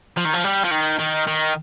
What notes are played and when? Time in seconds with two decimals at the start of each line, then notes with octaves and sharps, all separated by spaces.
0.17 F3
0.25 D#3
0.33 F3
0.44 G3
0.64 F3
0.71 D#3
0.99 D#3
1.27 D#3